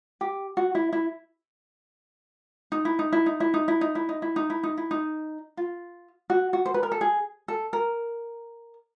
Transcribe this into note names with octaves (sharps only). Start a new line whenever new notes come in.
G4
F#4
E4
E4
D#4
E4
D#4
E4
D#4
E4
D#4
E4
D#4
E4
D#4
E4
D#4
E4
D#4
E4
D#4
F4
F#4
F#4
C5
B4
A#4
A4
G#4
A4
A#4